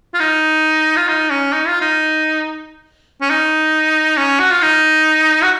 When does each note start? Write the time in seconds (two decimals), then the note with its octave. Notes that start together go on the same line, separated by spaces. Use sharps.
0.14 F4
0.20 D#4
0.96 F4
1.08 D#4
1.30 C#4
1.52 D#4
1.67 F4
1.81 D#4
3.21 C#4
3.30 D#4
4.17 C#4
4.39 F#4
4.51 F4
4.62 D#4
5.43 F#4